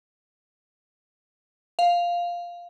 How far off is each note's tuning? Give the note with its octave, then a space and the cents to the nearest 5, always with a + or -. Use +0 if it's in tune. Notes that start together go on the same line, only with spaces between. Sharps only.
F5 +0